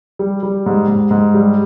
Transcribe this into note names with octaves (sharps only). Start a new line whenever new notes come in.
G3
G3
G#2
G#2
G#2
G3